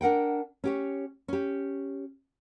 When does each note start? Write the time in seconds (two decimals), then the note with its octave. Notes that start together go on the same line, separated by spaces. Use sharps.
0.01 D4 A#4 F#5 G5
0.64 C#4 G4 C#5
1.28 C#4 G4